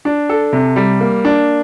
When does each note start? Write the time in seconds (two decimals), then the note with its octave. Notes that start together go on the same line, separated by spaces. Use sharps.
0.05 D4
0.29 A4
0.53 C3
0.76 G3
1.01 A#3
1.25 D4